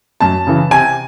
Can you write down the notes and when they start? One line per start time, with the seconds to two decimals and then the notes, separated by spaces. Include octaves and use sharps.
0.21 F#2 A5
0.47 C#3 E3
0.71 C3 G#5